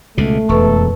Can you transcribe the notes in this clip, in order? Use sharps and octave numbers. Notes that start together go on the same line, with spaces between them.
C#2 B2 A3
E1 F2 A4 B4 C#6